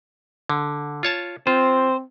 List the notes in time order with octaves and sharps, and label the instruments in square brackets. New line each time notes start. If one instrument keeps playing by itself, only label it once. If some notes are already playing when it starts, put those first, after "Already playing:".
[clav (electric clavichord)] D3
F4 C#5 A5
[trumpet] C4 [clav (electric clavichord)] F4 [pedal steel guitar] C5